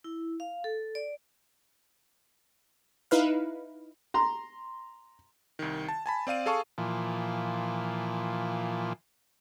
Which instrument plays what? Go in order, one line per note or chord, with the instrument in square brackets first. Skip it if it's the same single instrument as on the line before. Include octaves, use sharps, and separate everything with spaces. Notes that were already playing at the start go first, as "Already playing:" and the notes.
[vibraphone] E4
F5
A4
D5
[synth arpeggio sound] D#4 E4 B4 F5
[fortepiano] A#5 C6
[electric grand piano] C2 D#3
A5
G#5 A5 B5
C4 D5 F5 D#7
G#4 A4 F5 A5 C#6
[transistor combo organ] A#2 E3 F3